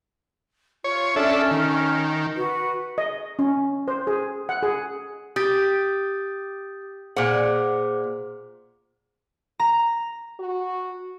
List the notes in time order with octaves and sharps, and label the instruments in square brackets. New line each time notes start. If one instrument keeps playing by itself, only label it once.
[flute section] F4 [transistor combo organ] C#5
[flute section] C#4 F6 [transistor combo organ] D4 A4 E5
[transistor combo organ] D#3
[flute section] F#4 B4
[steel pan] D#5
C#4
C5
G#4
F#5
G#4
[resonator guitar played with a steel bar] G4 [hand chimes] D#6 G6 A6
[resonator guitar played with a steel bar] A#2 F#5 [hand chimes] G#4 C5 D6
[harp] A#5
[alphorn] F#4